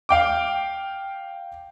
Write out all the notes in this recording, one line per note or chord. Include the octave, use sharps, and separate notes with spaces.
F5 G5 D6